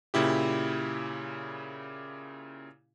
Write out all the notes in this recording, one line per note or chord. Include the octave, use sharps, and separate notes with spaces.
A#2 C#3 E4 G4